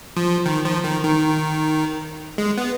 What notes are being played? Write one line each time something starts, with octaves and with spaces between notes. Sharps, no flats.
F3
D#3
F3
D#3
D#3
G#3
B3